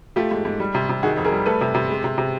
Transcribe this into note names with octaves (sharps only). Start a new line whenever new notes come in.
A3 F4 G4
G#2
G#2
G3
C3
C3
D#3 F#4 G#4
F2
G#4 A#4
G3
A3 A4 B4
C3
C3
G#3
C3
C3